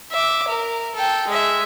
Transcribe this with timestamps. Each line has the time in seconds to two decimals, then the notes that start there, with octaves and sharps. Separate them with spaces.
0.12 E5 D6
0.48 A#4
0.95 A4 G5
1.27 G#3 E5